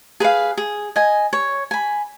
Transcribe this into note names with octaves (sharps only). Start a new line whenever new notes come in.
G#4 B4 F5
G#4
D#5 G#5
C#5
G#5 B5